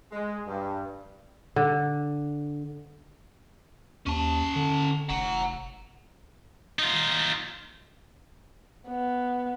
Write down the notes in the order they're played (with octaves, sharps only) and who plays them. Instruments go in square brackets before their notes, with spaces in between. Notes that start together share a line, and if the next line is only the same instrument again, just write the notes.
[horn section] G#3
G2
[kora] D3
[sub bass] D#2 [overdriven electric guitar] C#4 A5
[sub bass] D3
[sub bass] F1 [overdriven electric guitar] F#5 A#5
[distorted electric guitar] D#4 F4
[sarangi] B3